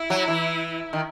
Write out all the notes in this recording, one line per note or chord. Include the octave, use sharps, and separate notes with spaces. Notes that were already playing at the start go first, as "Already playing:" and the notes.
Already playing: E4
F#3
E3
D#3